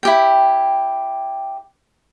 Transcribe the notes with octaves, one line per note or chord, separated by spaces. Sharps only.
E4 G4 G5